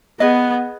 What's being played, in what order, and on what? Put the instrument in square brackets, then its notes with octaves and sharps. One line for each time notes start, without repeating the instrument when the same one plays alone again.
[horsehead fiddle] B3 [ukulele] G#4 B4 D#5